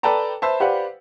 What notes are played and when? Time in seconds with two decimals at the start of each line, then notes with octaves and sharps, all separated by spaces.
0.03 A4 B4 D5 G5 A5 A#5
0.42 B4 C5 E5 A5
0.60 G4 B4 C5 D5 F5 F#5